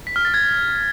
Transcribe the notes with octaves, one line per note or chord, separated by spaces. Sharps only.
B6
F6
A6
G#6